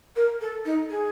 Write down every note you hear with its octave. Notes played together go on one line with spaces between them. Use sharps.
A#4
A4
D#4
G#4